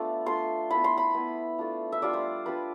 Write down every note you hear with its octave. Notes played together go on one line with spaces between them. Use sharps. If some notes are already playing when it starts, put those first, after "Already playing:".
Already playing: A3 B3 D4 F4
A3 D4 F4 C6
B3 E4 B5
C6
B5
B3 E4
A3 D4 F4
E5
G3 D4 F4 D5
C5
G3 D4 F4 B4